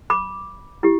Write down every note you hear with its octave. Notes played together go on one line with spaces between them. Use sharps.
B5 D6
E4 G4